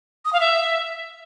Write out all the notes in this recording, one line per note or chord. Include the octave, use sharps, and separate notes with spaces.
D#6
F5
E5